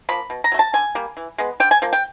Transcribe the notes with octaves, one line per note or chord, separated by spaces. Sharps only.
F3 A#3 B5
B2
A#5
F#3 A3
A5
D3 G#5
G3 A#3
E3
G#3 B3
D3 G5
G#5
F3 A#3
G5